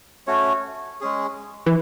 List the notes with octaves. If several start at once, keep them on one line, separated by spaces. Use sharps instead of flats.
A3 C#4 F#4 C#5
G#3 C#4 G#4
E3